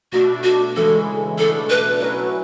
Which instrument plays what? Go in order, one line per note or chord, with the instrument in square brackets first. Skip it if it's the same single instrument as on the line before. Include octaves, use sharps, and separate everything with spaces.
[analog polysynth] B2 A3 D4 [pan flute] F#4
[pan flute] F#4
[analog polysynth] C#3 E3 G#3 [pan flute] A4
[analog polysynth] B2 A3 D4 [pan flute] A4
[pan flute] B4
[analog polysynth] F#3 C#4 E4 [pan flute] B4